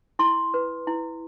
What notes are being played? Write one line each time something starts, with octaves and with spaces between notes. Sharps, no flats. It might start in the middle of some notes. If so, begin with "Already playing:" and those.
E4 C6
B4
E4